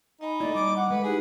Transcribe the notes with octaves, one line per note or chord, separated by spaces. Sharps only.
D#4 D#5 G#5 B5
A3 A#3 E4 D5
G3 D6
F#5
G#3 A3 B4
D#4 E4 G4 G#4 B4 F#5